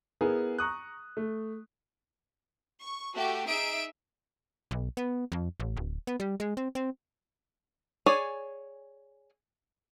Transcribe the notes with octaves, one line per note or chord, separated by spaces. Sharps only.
B3 E4 G#4 A#4
A#5 C#6 D#6 F#6
A3
C#6
A3 F#4 G4
D#4 G#4 E5 D7
B1
B3
F2
A1
D1
B3
G3
G#3
C4
C4
G#4 C#5 D5 G#5